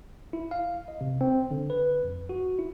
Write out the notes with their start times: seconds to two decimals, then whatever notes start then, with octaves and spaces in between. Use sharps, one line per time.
0.33 E4
0.51 F5
0.88 D#5
1.01 C3
1.21 C4
1.51 D3
1.70 B4
2.03 F2
2.29 F#4
2.59 E4